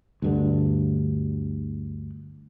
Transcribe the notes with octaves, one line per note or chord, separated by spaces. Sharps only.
D2 G2 D3